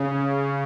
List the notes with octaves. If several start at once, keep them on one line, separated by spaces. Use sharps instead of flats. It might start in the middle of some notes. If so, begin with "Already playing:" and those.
Already playing: C#3